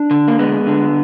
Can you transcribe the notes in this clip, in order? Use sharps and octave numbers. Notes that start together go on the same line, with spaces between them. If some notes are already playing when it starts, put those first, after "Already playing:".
Already playing: D4
D3
A#3
G#3 B3
D3